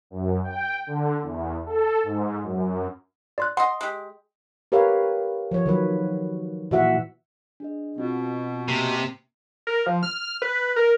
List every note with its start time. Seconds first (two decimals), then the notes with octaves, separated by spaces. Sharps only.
0.10 F#2
0.44 G5
0.87 D3
1.22 E2
1.65 A4
2.03 G#2
2.43 F#2
3.38 D5 C6 F#6
3.57 D#5 F#5 C6
3.81 G#3 G4
4.72 G4 A#4 B4 C#5 F5
5.51 F3 C#5
5.66 D#3 F#3 B4
6.71 A#2 E3 F#4 E5 F#5
7.60 D4 G#4 D#5
7.96 B2 B3 C4 F4
8.68 C3 A#3 C7
9.67 A#4
9.86 F3
10.03 F6
10.42 B4
10.76 A#4